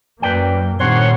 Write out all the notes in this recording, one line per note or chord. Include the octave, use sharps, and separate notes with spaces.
F#2 A#3 B4 D5 G5
G2 A#2 D#3 G3 C4 C#5 F#5 C6